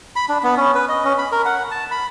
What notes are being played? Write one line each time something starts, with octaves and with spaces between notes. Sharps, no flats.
B5
D4
B3
C#4
B4
D#5
C#4
B5
A#4
F#5
A5
B5